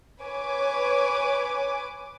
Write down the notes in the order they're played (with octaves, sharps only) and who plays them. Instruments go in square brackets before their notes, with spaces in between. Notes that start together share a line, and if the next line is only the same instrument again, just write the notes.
[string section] B4 C#5 G#5 D6